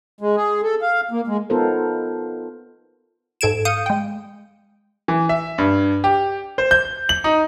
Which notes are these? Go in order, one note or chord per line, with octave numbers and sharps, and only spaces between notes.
G#3
G#4
A4
F5
A#3
G#3
B3 D#4 F4 A4 A#4 C5
G#2 A4 G#6 D7 E7
F5 D#6 G6 C#7 D#7
G#3 G5
E3
E5
G2
G4
C5
G6
F#7
D#4